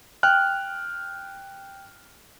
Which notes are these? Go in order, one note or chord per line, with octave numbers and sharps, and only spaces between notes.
G5 F6 F#6